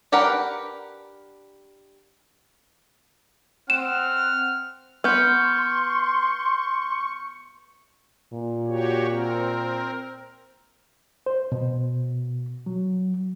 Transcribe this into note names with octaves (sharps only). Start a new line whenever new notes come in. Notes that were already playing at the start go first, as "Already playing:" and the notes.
D4 G4 A#4 B4 F#5
C4 F#5 F6 E7
B3 C6 C#6 F6 G6
A#2
F#4 G4 C#5
C4 A#4
C5
B2
F#3